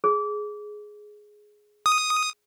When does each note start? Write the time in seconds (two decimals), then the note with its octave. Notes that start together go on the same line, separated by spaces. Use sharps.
0.04 G#4
1.86 D#6